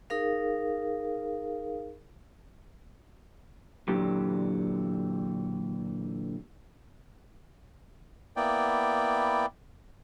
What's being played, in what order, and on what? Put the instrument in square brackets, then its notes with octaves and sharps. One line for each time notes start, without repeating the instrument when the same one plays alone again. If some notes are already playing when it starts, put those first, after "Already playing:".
[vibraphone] D#4 G#4 A#4 F5
[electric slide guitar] A#2 D3 E3 F#3 G4
[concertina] A#3 B3 E4 D5 G5